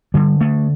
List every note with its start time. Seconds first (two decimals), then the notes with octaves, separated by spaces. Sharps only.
0.14 D3 G3
0.41 A3